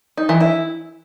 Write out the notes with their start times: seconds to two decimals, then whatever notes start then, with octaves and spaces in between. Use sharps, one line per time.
0.17 D#4
0.29 E3
0.41 E4